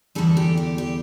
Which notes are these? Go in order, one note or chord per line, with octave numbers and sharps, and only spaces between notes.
E2 D3 G3 A4
G4
G4
G4